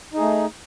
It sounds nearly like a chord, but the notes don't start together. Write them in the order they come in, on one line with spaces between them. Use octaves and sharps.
D#4 G#4 A3